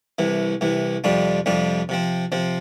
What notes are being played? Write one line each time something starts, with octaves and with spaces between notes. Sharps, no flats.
C2 C3 E3
C2 C3 E3
F2 C3 G3 D4 F4
F2 C3 G3 D4 F4
C3 F3 C4
C3 F3 C4